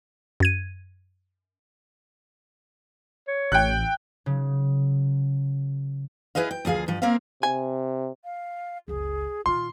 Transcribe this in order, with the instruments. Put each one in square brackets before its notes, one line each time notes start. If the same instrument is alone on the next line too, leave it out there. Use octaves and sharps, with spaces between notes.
[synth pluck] F#2 G#6 D#7
[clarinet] C#5
[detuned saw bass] A1 [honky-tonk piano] G5 F#6
[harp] C#3 F#3
[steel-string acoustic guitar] E4 G#4 B4 D#5 F5
G5
D2 F3 G#4 F5
G2 F3
A#3 C4 A#4 E5 F5
[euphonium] C3 [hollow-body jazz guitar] G#5
[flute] F5
[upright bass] F#1 C#2 [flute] G#4
[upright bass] A#2 D#3 [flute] F4 [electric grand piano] C6